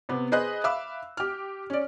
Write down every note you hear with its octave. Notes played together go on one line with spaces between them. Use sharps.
C3 B3
G#4 B4 C5 D#5 F#6
E5 F5 B5 D6 E6
G4 F6
C#4 D5